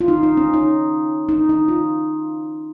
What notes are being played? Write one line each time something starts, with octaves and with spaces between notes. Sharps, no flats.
F4
D#4
D#4
C#4
D#4
D#4
D#4
F4